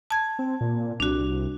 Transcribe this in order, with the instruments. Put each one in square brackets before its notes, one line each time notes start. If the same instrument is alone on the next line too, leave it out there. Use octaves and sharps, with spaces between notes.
[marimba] A5 G#6
[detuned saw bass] C4
A#2
[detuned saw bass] C2 [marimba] D4 F#4